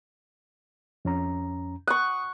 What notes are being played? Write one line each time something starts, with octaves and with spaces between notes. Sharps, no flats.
F2 C#4 A#5
F#5 C#6 D#6